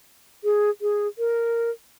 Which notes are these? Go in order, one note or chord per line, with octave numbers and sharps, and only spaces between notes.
G#4
G#4
A#4